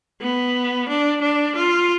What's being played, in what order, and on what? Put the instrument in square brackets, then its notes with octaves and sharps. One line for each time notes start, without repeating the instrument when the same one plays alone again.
[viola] B3
D4
D4
F4